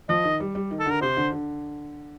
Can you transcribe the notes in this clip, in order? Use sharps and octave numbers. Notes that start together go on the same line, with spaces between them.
F3 D#5
D#3
G3
G3
D#3
A4
D3 A#4
C3 C5
D3
D3